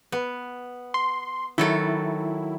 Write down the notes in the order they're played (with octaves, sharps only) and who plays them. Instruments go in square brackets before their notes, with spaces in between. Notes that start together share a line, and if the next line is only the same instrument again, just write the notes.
[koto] B3
[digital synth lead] C6
[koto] D#3 F#3 A4 [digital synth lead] E4